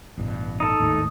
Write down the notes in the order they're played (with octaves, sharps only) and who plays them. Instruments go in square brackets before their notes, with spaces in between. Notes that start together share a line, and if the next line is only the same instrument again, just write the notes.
[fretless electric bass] A1 G2 B2
[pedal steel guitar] D#4 A4 [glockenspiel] D#6
[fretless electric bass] G#1 D#2 A2